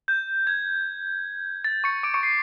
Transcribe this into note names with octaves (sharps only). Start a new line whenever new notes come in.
G6
G#6
A6
C#6 C#7
D6 D7
C#6 C#7
C7